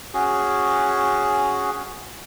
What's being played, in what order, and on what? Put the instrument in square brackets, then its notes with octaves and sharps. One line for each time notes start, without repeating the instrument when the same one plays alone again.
[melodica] C#4 F#4 G#4